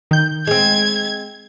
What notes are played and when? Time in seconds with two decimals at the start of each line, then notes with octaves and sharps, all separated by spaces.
0.11 D#3 G6
0.47 G#3 C4 G#6